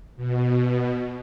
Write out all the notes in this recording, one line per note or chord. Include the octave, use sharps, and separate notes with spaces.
B2